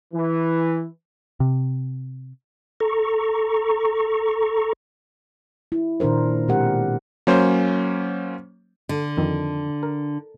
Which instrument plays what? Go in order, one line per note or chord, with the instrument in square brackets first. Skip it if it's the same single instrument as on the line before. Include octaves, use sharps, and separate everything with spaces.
[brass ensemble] E3
[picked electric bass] C3
[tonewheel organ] A4 A#5 C#6
[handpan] E4
A#2 D#3 D4 A#4 C5
B2 G#3 C4 G4 A#4 F#5
[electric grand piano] F#3 A#3 C#4 C5
[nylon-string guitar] D3
[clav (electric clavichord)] F2 D#3
A#4